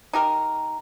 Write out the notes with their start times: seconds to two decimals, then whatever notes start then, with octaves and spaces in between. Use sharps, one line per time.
0.13 D#4 G4 A#4